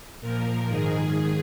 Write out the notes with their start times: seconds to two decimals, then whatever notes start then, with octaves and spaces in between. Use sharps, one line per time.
0.21 A#2 F3 A#4
0.67 G#2 D#3 G#4